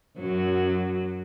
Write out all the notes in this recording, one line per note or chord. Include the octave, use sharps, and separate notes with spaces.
F#2 F#3